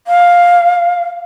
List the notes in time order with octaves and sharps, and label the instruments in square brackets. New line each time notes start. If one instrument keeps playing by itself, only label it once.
[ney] F5